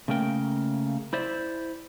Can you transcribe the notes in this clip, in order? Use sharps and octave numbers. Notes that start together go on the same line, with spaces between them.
C#3 A3 A#3 A#4 G5
E4 C5 D5 E5